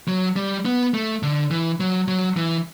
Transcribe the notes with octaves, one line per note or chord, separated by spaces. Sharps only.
F#3
G3
B3
A3
D3
E3
F#3
F#3
E3